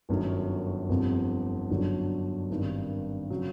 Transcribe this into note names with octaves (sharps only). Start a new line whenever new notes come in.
G1 F#2 D#3 F#3
G1 F2 C3
G1 F#2 D3 F#3
G#1 G2 D#3
C#3 F#3